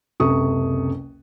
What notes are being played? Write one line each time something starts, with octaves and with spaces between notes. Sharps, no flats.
F#1 C#2 C3 A4 C#6 D#6